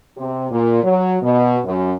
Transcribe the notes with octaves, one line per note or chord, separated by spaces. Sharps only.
C3
A#2
F#3
B2
F#2